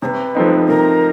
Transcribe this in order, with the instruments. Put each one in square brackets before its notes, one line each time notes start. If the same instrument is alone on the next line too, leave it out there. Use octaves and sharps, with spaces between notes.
[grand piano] C3 [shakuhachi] B4 C#5
[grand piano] F3 A3 C4 D#4
[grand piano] C3 [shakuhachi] A#4